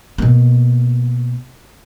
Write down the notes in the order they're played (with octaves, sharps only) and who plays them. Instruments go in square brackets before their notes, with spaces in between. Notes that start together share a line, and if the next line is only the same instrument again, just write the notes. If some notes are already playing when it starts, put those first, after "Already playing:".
[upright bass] B2 A#3